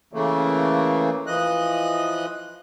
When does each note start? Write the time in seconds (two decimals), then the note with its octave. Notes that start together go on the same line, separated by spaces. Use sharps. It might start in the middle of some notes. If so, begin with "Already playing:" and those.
0.13 C#3 E3 A3 A#3
1.27 E3 F3 D#5 F#6